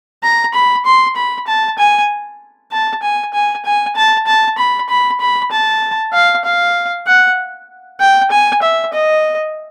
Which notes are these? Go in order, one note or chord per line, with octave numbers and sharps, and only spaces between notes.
A#5
B5
C6
B5
A5
G#5
A5
G#5
G#5
G#5
A5
A5
B5
B5
B5
A5
F5
F5
F#5
G5
G#5
E5
D#5